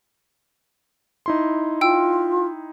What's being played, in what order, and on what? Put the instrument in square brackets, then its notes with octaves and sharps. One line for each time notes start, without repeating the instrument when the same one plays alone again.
[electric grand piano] D#4 E4 C6
[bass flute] F4 [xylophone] G5 E6